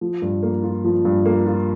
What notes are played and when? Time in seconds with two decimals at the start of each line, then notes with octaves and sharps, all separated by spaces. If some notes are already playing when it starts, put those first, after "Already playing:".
0.01 F3
0.22 G2
0.43 A#3
0.63 F4
0.84 F3
1.05 G2
1.26 A#3
1.47 F4